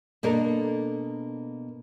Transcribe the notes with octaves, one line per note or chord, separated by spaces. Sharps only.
B2 A#3 D4 A4 A#4